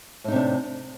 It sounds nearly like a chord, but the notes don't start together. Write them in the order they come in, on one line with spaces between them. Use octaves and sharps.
A2 D#4 C3 D4